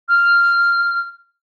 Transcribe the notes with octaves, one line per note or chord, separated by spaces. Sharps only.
F6